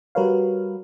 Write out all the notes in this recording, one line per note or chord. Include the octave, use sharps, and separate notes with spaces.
G3 F#4 A#4 B4 C#5 F5